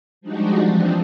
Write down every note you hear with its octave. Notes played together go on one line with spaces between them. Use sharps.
F3 G3 G#3 D4 D#4 F#4
E3 F3 G#3 C4 D4